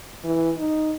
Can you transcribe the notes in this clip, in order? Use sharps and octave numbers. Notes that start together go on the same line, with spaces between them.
E3
D#4